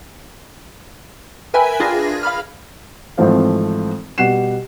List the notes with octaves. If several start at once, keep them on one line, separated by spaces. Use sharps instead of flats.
A#4 B4 E5 G5 G#5 B5
D4 F4 G#4 A#6
F5 B5 F6
G#1 E3 F3 A3 C4 F5
B2 G3 F#5 C7 E7